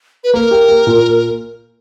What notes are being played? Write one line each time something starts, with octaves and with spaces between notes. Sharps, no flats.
B4
A#3 A#4
G4
A#3
A#2